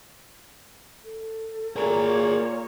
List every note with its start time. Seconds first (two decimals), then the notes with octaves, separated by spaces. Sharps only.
1.05 A4
1.76 A#2 A#3 G#4 A#4 C#5